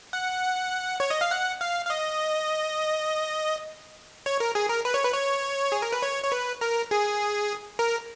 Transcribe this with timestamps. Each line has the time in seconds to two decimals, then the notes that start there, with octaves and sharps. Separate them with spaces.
0.13 F#5
1.00 C#5
1.10 D#5
1.21 F5
1.31 F#5
1.61 F5
1.85 F5
1.90 D#5
4.26 C#5
4.40 A#4
4.55 G#4
4.70 A#4
4.85 B4
4.94 C#5
5.04 B4
5.14 C#5
5.72 G#4
5.82 A#4
5.92 B4
6.02 C#5
6.23 C#5
6.32 B4
6.61 A#4
6.91 G#4
7.79 A#4